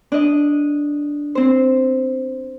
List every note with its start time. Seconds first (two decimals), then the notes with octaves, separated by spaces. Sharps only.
0.12 D4 D#5
1.35 C4 C5